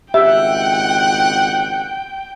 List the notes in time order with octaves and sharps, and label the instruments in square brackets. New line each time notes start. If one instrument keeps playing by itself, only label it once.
[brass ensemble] G#1 C#2 F#5 [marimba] G4 [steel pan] E5 [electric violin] G5